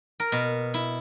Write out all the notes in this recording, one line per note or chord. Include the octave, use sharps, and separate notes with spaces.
A#4
B2
E4